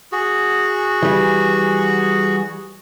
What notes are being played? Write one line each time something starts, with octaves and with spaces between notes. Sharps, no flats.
F#4 G#4
E3 G3